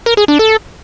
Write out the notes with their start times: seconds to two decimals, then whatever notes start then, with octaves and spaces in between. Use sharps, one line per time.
0.06 A#4
0.17 G#4
0.28 D4
0.39 A4